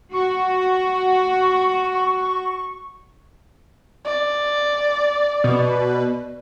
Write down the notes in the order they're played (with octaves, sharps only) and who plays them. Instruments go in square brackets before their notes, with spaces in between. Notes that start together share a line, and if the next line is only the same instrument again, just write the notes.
[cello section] F#4 [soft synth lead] C#6
[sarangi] D5
[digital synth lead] B2